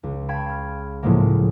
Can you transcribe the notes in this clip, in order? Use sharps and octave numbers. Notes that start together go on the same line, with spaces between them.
C#2
F5 G5 A5 B5 C#6 G#6
F6
A2 C#3 F3 F#3 G#3 A#3